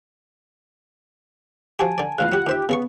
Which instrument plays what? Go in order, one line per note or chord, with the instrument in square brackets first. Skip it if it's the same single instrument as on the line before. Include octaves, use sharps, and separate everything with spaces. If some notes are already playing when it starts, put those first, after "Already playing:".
[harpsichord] F3 F#4 G4 [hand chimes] G#5 A5
[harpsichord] D3 D5
[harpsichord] E2 A2 C#3 [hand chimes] F4 F#6 [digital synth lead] F5
[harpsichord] F#3 G4 [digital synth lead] F#5
[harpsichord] D#2 C5 E5 [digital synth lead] G4
[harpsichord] C#3 G#4 C#6 [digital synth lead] B3